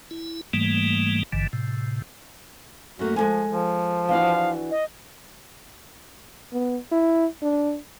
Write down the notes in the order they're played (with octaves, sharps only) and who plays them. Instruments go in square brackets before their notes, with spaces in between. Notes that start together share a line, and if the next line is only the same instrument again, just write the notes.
[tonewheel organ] E4
G#2 E3 G3 A3 A#3
G#1 G2 D3 E3
A2 C3
[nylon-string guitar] F#2 A3 A#3 [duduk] F#4
[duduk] F3 [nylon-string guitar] G#3 A4 G#5
[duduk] F3
[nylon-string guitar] E3 D4 F#4 [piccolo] F5
[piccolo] D#5
[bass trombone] B3
E4
D4